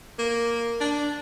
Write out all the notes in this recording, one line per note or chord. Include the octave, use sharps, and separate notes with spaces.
A#3
D4